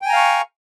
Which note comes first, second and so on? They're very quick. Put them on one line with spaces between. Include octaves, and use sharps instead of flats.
G5 G#5 A#5 F5 C#6